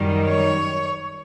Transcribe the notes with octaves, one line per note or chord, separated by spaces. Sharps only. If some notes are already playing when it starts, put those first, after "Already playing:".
Already playing: F#2 D#3 G3
C#5